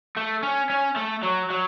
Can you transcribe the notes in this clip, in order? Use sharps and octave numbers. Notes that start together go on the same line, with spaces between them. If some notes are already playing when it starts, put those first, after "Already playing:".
A3
C#4
C#4
A3
F#3
F#3